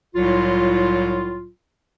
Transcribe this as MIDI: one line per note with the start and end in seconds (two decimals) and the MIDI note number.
0.15 1.48 36
0.15 1.48 45
0.15 1.48 54
0.15 1.48 65